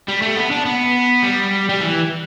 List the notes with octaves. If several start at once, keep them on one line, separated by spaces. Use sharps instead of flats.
G3
A3
B3
D4
B3
G3
G3
E3